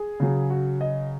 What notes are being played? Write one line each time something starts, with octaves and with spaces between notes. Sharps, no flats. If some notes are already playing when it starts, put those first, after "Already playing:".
Already playing: G#4
C#3 F#3
F#4
D#5